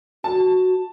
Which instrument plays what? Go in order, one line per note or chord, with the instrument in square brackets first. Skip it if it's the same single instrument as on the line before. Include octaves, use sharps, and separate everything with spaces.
[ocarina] F#4 [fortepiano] A5